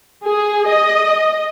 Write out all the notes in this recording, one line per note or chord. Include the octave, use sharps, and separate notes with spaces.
G#4
D#5